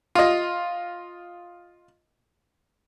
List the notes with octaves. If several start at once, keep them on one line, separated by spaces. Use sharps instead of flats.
F4 D#5